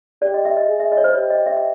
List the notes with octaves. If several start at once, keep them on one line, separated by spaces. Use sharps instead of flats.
G4 D5
D#5
E5
D#5
G#4
E5
D#5
C#5
C5
G4 C#5
D#5
E5
E5